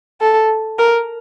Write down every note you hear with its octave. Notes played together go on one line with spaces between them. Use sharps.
A4
A#4